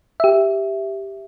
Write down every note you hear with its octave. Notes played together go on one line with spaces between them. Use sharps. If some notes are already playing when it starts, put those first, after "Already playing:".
G4 E5